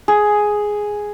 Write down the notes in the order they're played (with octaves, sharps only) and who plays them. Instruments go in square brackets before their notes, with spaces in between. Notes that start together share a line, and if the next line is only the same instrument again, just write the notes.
[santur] G#4